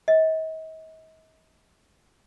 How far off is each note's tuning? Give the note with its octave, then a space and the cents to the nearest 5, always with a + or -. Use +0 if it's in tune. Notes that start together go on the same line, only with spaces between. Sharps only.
D#5 +40